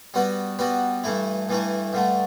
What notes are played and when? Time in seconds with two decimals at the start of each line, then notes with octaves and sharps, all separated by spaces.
0.14 G3 B3 F#4 B4
0.59 G3 B3 F#4 B4
1.04 G2 E3 A3 E4
1.49 G2 E3 A3 E4
1.93 G2 D3 A3